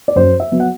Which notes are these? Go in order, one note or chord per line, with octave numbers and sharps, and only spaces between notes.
D5
F#2 C5
E5
F#3 B3
F#5